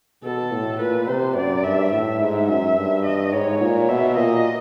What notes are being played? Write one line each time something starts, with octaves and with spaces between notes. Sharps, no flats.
B2 A4
A2
A#2 B4
C3 C5
F#2 D5
G2 E5
A2 E5
G#2
F#2 E5
G2
D#5
G#2 C#5
A#2
B2 E5
A#2 D#5